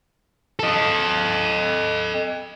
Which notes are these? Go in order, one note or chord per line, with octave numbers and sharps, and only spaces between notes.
A4 D#5